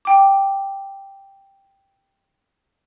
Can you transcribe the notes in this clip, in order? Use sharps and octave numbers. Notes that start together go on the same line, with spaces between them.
G5 D6